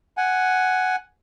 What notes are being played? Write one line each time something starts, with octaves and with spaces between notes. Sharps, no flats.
F#5 G#5